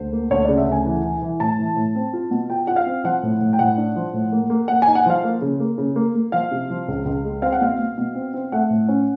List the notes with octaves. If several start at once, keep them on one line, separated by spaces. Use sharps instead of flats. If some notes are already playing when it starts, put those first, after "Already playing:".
Already playing: D2 C5
A#3
D2 C#5
C#3 D5
E5
D2 G#5
E3
E3
E3
A2 A5
E3
A2
C4
F4
B2
F4 G5
F4 F#5
F5
C4
F3 F#5
A2
A2
G5
A2 F#5
D4
F3
A2
A#3
A#3
A#3 F#5
G#5
D#4
F#5
F3 F5
A#3
C#3
A#3
C#3
A#3
A#3
F3 F5
C3
F3
C#2
C#2
G#3
C4 F5
F#5
B2 F5
B2
B2
C4
C4
A3 F#5
A2
C#4